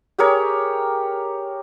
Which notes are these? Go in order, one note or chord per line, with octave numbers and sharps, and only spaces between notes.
G4 G#4 A#4 C#5